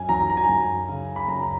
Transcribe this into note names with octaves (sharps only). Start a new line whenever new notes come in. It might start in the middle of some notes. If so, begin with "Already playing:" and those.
Already playing: F#2 G#5
F#3 A#5
A#5
G#5
A#5
F#2
C#3
B5
F#2 A#5
A#5